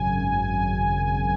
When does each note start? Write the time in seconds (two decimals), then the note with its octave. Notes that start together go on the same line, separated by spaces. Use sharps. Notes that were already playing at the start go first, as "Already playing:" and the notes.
Already playing: G#1 F#2 C#3 G#5